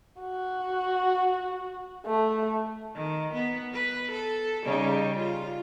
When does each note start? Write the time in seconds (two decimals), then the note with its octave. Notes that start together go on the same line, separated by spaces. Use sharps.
0.20 F#4
2.06 A3
2.95 D#3
3.34 B3
3.74 B4
4.11 A4
4.64 C#3 G3 D#4
5.16 F4